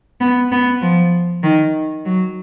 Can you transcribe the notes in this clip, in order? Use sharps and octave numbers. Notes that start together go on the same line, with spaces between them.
B3
B3
F3
D#3
F#3